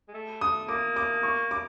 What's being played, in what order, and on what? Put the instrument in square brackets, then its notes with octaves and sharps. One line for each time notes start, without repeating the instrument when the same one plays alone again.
[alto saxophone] G#3
A3
[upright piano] D#6
[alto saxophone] A#3 [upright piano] D6
[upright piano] D6
C#6
D6